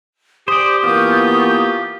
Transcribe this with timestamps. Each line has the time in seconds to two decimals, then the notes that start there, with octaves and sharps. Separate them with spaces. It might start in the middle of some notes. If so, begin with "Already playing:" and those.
0.48 G4 C5 D5 G#5 D#6
0.84 E3 A#3 B3 F4 C#6 D#6 G6